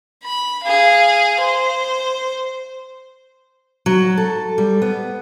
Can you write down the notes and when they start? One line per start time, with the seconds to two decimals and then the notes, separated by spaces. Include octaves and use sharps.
0.24 B5
0.64 G#4 F5
1.40 C5
3.86 F#3
4.17 A4
4.58 G3
4.82 B3